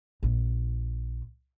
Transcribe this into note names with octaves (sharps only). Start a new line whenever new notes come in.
A#1 F4